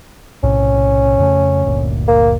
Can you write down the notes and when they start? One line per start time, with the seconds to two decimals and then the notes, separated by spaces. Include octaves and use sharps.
0.44 B1 A2 C3 C#4
1.19 F2 C#3 A3
1.65 G1 D2 A#2
2.08 A#3